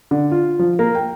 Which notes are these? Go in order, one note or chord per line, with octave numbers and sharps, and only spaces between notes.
D3
F4
F3
A#3
G5